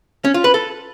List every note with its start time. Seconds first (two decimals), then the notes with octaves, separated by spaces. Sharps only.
0.25 C#4
0.34 F4
0.44 B4
0.54 A4